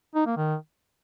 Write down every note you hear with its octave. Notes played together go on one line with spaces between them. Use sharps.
D#4
A#3
D#3